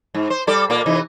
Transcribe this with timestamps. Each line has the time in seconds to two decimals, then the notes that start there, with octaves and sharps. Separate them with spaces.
0.14 G#2
0.30 C5
0.47 G3 A4 D5
0.70 A#2 A#3 D5
0.86 C3 E3 D#4